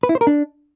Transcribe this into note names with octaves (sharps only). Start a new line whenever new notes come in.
B4
E4
C5
A#4
D4